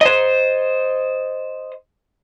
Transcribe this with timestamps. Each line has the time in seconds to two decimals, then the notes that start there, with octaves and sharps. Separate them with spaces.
0.01 C5 D#5